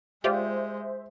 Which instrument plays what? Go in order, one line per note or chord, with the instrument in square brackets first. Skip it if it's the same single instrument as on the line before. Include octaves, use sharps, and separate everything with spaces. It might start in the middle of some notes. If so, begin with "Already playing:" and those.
[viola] G#3 [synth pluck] F4 G4 D5 [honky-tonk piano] C5 E5